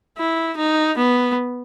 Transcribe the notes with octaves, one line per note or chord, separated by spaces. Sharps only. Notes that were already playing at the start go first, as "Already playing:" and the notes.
E4
D#4
B3